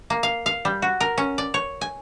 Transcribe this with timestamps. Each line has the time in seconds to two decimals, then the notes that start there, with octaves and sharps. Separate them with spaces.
0.10 A#3
0.23 F5
0.46 F5
0.65 G3
0.82 F#4
1.00 A#4
1.18 C#4
1.38 D5
1.54 C#5
1.81 G#5